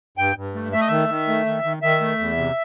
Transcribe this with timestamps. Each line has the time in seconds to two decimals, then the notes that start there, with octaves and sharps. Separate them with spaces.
0.18 G2 G5
0.36 G2
0.55 A3
0.73 A3 E5
0.81 D#5
0.88 D#3 E5
1.09 D#3
1.28 A3
1.46 D#3
1.64 D#3
1.82 D#3 E5
2.01 A3
2.19 E2
2.37 C3